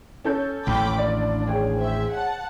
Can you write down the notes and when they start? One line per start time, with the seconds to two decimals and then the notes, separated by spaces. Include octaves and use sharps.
0.25 C#4 A4 G6
0.67 A1 D#2 G5 B5 D6
0.98 D4 D5
1.47 G#4 C#5 G5
1.77 C5 E5
2.12 F#5 A5